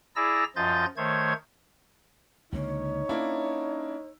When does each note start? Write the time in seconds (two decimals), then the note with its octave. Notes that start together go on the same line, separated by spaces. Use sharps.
0.16 E4 G#4 D5 A#5 E6 A#6
0.56 F#2 F3 F4 D#5 G6 A6
0.97 D#3 A3 C5 C#5 G#6
2.52 C#2 D3 A#3 D#4 C#5
3.09 A#3 C#4 D4 E4